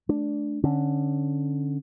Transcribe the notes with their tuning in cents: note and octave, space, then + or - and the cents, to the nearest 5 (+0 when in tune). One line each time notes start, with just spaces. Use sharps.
A3 -35 D4 +0
D3 +0 C#4 -15